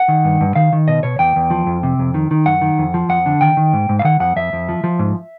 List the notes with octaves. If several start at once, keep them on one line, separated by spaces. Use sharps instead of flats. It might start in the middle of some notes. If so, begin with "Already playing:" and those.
Already playing: F#5
D#3
G2
G2
D#3 F5
D#3
B2 D#5
B2 C#5
E2 G5
E2
F3
F2
C3
F2
D#3
D#3
F#2 F#5
D#3
F2
F3
F2 F#5
D3
D#3 G5
D#3
G#2
G#2
F5
D#3 F#5
F2 F#5
F2 E5
F2
F3
F3
G#2